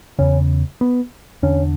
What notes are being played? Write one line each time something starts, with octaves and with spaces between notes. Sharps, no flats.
E2 C#3 C#4
B3
E2 D3 C#4